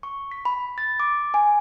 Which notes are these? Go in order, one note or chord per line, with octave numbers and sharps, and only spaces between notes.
C#6
B6
B5
A6
D6
G#5